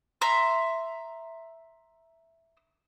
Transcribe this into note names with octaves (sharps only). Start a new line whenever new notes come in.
E5 A#5 C6